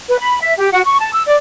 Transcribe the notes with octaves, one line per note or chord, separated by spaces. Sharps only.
B4
B5
E5
G4
F#4
C#6
A5
E6
D5